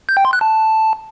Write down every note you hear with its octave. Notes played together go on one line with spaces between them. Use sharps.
G6
G5
C6
F#6
A5